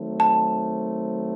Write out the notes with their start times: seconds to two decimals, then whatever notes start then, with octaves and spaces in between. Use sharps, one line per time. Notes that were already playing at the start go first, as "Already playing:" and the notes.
Already playing: D#3 F#3 A3 C4
0.20 A5